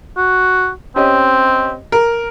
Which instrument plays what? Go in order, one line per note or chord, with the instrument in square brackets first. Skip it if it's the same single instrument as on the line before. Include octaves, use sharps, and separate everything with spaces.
[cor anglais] F#4
[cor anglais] C4 [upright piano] C#4 G4 D#5
[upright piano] A#4